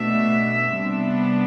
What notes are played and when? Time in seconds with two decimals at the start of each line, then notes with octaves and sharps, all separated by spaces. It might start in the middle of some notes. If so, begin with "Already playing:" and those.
Already playing: B2 A3 D4 E5
0.75 C3 G3 B3 D4